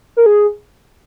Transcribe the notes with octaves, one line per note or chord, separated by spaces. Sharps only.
A#4
G#4